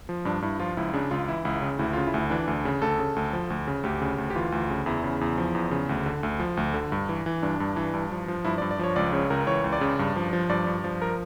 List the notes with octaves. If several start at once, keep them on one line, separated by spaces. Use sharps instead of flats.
F3
G2 D4
G2 E4
F3 F4
C#2 E4
C#3 D4
C#2 F4
E3 E4
C#2 E4
C#3
D2 E4
C#3 F4
E4
D2
E3 D4
D2
C#3
D2 A4
C#3
D2
F3
D2
C#3
D2 G4
C#3
D2
G4
E3 F4
D2
C#3
E2 E4
C#3
E2
F3
E2
C#3
D2
D3
D2
F3
D2
D3
G2
E3
E3
G2 D4
G2
E3
G2
F3
F3
G2 E4
G2 D5
D5
F3 C#5
C#2 D5
C#3 C#5
C#2 A#4
E3 C#5
C#2
D5
C#3
G2
F3
F3
G2 D5
G2
F3
A#4